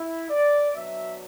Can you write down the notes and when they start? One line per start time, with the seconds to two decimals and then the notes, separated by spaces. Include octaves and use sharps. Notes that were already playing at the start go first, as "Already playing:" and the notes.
Already playing: E4
0.30 D5
0.75 B2 F#3 D4 E5